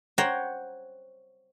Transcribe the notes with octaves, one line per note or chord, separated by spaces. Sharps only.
C5 C#5 F#5 G5 A#5